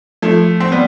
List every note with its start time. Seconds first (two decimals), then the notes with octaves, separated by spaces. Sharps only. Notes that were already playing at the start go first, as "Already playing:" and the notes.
0.22 F3 A3
0.60 C4
0.72 G3 B3